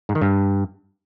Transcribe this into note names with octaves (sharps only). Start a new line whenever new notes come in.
G#2
D#3
G2